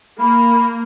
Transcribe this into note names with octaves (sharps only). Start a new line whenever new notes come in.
A#3 B5